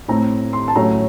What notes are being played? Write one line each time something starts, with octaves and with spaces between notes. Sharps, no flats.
A2 A3 C4 A#5
C6
A5
A2 F#3 A3 C#4 A#5